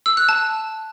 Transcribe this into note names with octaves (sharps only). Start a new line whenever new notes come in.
E6
F#6
A5